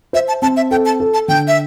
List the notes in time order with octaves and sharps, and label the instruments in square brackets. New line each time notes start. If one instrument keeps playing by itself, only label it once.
[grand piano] C5 [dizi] E5
[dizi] A5
[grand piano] C4 [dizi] A5
[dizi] E5
[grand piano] A4 [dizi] G5
[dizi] A5
[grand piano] A4
[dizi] A5
[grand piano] D3 [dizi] G5
[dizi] E5